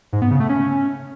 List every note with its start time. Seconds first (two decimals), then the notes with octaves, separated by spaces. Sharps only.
0.13 G#2
0.22 B3
0.31 C#3
0.40 A3
0.49 C#4